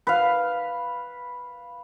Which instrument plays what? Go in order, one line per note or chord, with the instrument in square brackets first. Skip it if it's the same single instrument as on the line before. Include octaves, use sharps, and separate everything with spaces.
[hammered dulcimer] B4 F5